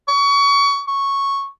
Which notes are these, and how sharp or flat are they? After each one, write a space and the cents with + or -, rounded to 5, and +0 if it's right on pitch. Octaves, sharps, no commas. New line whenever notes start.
C#6 +25
C#6 -5